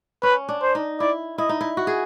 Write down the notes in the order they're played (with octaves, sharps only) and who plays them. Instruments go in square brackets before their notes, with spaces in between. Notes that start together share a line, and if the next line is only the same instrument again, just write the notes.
[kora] C#4 [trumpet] B4
[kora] D4
[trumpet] C5
[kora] D#4
[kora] E4 [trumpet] D5
[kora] E4 [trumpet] D#5
[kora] D#4
E4
F#4
G#4